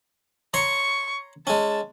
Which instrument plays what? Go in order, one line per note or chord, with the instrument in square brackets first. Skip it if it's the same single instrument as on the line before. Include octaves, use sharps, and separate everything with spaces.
[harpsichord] C#5 A#5 C6 [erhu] C#6
[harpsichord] G#3 C#4 [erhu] A5